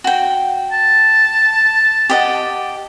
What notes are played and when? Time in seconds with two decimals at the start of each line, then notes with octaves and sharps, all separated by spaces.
0.04 F#4 G5
0.72 A5
2.10 G4 D#5 F#5